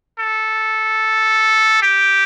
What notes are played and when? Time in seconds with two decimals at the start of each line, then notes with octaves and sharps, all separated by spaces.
0.19 A4
1.83 G4